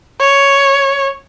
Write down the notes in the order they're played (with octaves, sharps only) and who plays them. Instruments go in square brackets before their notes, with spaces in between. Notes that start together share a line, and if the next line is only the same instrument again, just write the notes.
[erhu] C#5